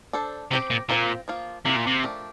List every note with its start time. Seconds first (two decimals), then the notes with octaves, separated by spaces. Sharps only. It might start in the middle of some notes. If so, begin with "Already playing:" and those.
0.13 D4 A4 C5
0.51 C3 C4 G4 C5
0.70 A#2
0.89 A#2 C4 F4 C5
1.28 F3 A#3 F4
1.65 C3 A#3 E4 G4
1.76 A#2
1.87 C3
2.04 F3 A3 D4 G4 A#4